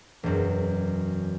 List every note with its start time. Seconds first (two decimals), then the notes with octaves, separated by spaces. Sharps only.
0.23 E1 F#2